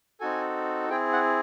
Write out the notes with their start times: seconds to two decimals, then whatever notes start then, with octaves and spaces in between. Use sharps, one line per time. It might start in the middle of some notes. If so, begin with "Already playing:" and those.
0.20 C4 D#4 F#4 A4 G#5
0.89 C4 E4 G#4 G5
1.13 F#5